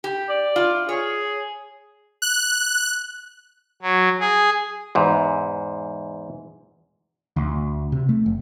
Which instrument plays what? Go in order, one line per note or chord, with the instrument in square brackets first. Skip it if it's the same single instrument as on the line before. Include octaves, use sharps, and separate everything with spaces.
[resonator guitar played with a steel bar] G4
[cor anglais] D5
[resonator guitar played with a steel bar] F4
[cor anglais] G#4 [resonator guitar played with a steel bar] C#5
[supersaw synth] F#6
[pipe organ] F#3
G#4
[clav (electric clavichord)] E2 G#2
[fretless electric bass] D2
C3
A3
F1